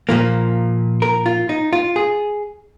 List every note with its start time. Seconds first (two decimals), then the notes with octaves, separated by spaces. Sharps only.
0.09 A#2 F3 A#3
1.02 A#4
1.26 F4
1.49 D#4
1.73 F4
1.96 G#4